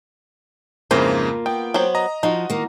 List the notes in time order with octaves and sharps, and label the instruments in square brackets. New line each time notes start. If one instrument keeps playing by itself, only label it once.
[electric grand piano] F2 G#2 C#3 [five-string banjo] E3 C5 [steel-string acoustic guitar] A#3 F4
[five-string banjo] B3 [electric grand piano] G5
[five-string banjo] F#3 B3 C5
[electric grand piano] D#5 A#5
[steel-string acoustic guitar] F3 [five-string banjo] D#4 F#4
[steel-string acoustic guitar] D#3 A#3